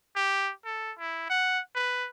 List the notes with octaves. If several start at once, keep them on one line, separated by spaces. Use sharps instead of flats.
G4
A4
E4
F#5
B4